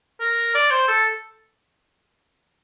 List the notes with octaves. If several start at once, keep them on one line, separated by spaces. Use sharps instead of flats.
A#4
D5
C5
A4